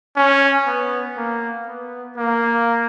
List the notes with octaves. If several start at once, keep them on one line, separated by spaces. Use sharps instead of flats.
C#4
B3
A#3
B3
A#3